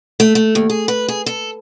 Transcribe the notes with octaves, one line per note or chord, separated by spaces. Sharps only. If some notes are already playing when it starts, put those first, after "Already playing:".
A3
A3
D#2
G#4
B4
G#4
A4